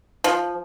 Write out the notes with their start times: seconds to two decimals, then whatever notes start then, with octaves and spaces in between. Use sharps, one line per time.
0.24 F3